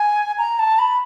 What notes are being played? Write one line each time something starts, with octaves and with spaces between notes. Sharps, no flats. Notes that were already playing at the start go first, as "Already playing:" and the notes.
Already playing: G#5
A#5
A5
B5